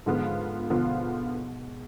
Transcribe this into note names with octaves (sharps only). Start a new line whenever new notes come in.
G#2 D3 F3 B3 F4
B2 D3 F3 B3 F4